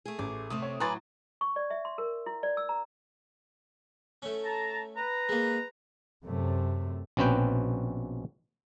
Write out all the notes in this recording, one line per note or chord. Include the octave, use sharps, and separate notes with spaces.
A3 G#4
A1 D6
C3 A3 C4 D#6
C#5
A2 F#3 B4 G#5 A#5 C6 D6 A6
C#6
D5
E5
C6
A#4
E4
D5
E6
A#5
A3 C#4
A5 A#5
B4 A#5
G#3 A#3
F#2 C3 A3
A#1 B2 C4 C#4 B4 G5